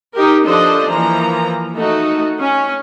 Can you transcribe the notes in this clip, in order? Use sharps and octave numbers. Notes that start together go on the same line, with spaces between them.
D#4 G4 A#4
F3 D4 A4 C5 D5 D#5
E3 F3 A#3 A#5
A3 D#4 F#4
C#4